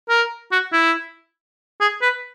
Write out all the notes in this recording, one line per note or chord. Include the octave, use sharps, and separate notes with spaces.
A#4
F#4
E4
G#4
B4